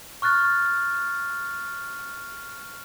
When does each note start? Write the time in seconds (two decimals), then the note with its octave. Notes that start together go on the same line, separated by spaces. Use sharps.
0.22 C#6 F6 F#6 A6